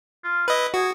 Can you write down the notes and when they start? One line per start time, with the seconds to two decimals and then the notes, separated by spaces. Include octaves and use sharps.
0.24 F4
0.48 E4 B4 D#5
0.74 F#4 G#4